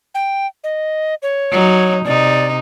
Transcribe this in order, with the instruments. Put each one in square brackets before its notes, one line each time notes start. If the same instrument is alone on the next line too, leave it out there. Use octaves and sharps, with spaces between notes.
[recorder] G5
D#5
C#5
[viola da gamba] F#3 D#4
[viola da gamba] C3 D#4 [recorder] D5